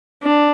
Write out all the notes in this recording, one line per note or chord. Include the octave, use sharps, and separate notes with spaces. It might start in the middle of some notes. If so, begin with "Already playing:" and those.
D4